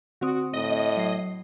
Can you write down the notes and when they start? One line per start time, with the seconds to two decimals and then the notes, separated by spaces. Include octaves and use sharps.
0.21 D3 C4 F#4 D#6
0.54 A2 D#5
0.97 F#3 C7